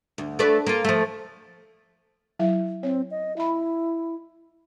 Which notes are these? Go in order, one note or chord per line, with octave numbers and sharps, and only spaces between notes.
D2
A3 B4 D5
A#3 F4
F3 A3
F#3 E4 E5
C4 C#5
D#5
E4 E5 B5